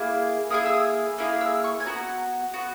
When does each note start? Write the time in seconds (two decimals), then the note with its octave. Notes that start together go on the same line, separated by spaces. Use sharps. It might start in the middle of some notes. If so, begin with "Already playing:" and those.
Already playing: A#3 E4 G#4
0.50 A#3 E4 G#4 D#6
0.66 E6
0.74 D#6
1.18 A#3 E4 G#4 D#6
1.41 E6
1.64 C#6
1.80 G#5
1.86 B3 F#4 A#5
2.54 B3 F#4